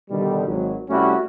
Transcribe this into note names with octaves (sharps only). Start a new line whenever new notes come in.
B2 D3 D#3 G3
G#1 F#3
C2 G3 A3 C#4 E4 F#4